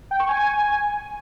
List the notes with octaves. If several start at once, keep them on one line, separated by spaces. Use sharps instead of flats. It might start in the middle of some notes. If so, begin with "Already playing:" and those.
G5
C#6
G#5